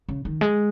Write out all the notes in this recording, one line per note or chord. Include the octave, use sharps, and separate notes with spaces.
C#3
D#3
G#3